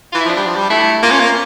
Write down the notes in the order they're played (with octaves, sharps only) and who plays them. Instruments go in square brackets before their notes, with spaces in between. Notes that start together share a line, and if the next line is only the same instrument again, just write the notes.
[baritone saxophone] E3 [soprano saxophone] F4
[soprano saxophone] E4
[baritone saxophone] F3
[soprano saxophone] D4
[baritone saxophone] G3
F3
G3
[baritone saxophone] A3 [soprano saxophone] E4
[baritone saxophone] A#3 [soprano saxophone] F4
[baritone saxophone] C#4
A#3